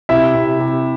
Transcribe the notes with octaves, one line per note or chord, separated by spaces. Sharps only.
C3 E4 E5
C3
C3